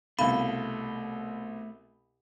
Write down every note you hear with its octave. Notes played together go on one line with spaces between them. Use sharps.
C2 B2 A3 F5 B5